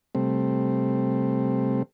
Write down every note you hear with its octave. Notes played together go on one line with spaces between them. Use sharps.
C3 G3 A3 C4